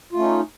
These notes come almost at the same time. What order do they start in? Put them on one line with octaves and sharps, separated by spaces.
F4 A3 C#4 D#4